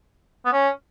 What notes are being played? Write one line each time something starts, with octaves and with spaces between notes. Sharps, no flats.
B3
C#4